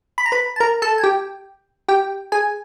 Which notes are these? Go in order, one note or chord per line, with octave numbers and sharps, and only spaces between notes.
B5
A#5
B4 B5
A5
A#4 A#5
A4 A5
G#5
G4 G5
G4 G5
G#4 G#5